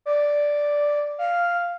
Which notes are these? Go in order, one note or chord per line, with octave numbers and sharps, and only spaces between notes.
D5
F5